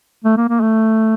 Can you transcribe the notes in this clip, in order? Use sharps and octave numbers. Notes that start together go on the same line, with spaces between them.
A3
A#3
A#3
A3